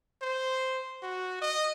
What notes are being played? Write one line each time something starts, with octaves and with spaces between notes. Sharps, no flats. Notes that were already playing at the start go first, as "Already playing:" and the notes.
C5
F#4
D#5